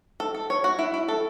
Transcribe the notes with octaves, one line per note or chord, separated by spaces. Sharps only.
A4
A4
C#5
F#4
E4
E4
A4